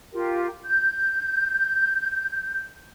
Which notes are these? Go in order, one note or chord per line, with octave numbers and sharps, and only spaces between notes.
F4 G4 A#4
G6